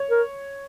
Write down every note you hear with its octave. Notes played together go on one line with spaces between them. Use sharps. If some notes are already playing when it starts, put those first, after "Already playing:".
Already playing: C#5
A#4